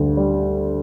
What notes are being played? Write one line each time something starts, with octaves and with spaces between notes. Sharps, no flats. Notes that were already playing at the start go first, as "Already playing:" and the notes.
Already playing: D2 G3
G3